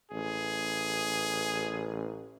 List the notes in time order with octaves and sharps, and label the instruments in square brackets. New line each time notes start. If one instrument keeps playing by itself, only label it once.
[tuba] A1 [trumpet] G#4